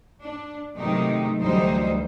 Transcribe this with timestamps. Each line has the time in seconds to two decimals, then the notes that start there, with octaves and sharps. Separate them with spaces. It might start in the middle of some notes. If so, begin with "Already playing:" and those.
0.21 D4
0.75 C3 D#3 F#3 G#3 A3 D#4
1.38 D2 E3 F#3 G3 D#4 C5